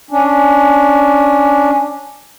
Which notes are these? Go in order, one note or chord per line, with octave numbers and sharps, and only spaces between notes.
C#4 D4